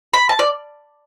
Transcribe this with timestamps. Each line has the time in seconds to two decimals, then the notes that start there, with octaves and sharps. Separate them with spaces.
0.14 B5
0.29 A5
0.39 D5